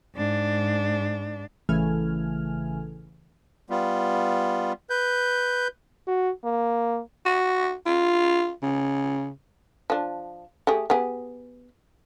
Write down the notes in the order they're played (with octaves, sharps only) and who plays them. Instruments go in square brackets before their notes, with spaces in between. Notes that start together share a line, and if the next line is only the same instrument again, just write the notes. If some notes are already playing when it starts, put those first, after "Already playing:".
[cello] G#2 D4
[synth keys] A1 C#3 E3 A3 G#5 F6
[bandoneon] G3 B3 F4
B4 G6
[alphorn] F#4
A#3
[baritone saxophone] F#4
F4
C#3
[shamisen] F3 D4
A3 G4 G#4
B3 G4 G#4